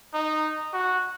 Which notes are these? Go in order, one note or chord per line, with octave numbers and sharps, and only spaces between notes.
D#4
F#4